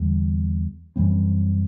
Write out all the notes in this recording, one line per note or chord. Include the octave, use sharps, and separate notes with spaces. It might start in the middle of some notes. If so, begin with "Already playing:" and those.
Already playing: E2 D3 G3
F#2 E3 G3 C4